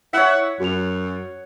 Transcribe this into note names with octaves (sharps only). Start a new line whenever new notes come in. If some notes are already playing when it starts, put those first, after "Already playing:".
E4 C#5 F#5 B6
F#2 F#4 F7